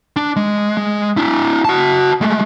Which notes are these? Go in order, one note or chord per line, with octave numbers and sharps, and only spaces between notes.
D4
G#3
G#3
D4 E4
F#4 A5
G#3 A3